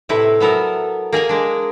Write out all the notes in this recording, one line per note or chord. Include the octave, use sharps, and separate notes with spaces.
A2 C3 E4 B4 E5
F#3 B3 A4 A#4
A#3 G#4 A#4 G#5
G#3 D4